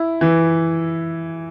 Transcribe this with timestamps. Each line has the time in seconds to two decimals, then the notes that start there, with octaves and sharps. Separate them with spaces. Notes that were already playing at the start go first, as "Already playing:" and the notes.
Already playing: E4
0.21 E3